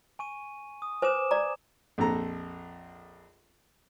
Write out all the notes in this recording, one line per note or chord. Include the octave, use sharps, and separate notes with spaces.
G#5 C#6 D#7
D#6
B4 C5 G#5 D6 E7
D5 A#5
A#1 F2 A4 A#5